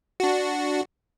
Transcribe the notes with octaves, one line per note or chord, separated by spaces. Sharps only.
D4 F#4